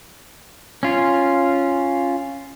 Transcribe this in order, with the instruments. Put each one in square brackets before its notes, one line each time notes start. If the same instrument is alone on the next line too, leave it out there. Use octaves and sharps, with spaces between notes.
[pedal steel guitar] C#4 F4